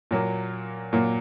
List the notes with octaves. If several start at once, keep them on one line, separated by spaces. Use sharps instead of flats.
A#2 F#3 A#3
A#2 F#3 A#3